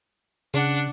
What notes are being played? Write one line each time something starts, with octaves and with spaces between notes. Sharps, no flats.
C#3 D4 F#5